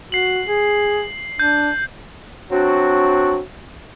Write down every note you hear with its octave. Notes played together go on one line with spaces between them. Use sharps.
F#4 C7 F#7
G#4
D4 G6
F#3 C4 D4 F#4